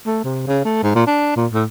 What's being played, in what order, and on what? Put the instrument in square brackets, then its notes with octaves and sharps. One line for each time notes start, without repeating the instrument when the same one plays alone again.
[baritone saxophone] A3
C3
C#3
A3
G#2
A#2
D4
A#2
A2